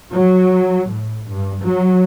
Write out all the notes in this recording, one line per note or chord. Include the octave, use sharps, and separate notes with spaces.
F#3
A2
G2
F#3